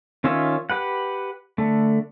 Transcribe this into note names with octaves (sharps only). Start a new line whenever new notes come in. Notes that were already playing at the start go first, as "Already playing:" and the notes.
D#3 C#4 F4 C#5 E5
G4 B4 F#5
D3 A3